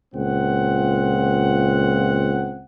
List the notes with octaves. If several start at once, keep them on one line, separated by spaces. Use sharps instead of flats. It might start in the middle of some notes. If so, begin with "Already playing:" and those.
C#2 A#2 C4 F#5